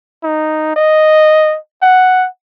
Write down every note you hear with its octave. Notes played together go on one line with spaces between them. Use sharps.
D#4
D#5
F#5